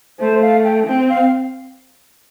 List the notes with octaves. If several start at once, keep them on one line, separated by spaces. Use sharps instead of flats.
A3 C5
F5
G5
C4 G5
F5